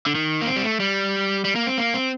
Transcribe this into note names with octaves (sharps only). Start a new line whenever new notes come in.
D3
D#3
A#3
C4
G3
A3
G3
G3
A#3
C4
A#3
C4